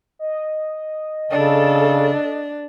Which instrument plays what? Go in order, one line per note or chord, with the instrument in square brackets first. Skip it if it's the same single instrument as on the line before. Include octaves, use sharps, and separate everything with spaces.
[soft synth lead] D#5
[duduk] C#3 [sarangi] D4 [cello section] A4